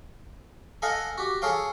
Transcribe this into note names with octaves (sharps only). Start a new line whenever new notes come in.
A4 D#5 F5 F#5 G#5
F#4 G4
G#4 A4 C#5 F5 G5